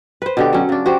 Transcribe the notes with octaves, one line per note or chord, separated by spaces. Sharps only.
B4 C5
B2 D3 G4
F#3 C#4
C#3 D4
F#4 G4 C5